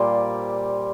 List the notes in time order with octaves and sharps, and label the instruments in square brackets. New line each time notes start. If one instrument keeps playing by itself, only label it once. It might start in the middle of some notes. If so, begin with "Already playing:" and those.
Already playing: [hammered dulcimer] A#2 G3 C5 D5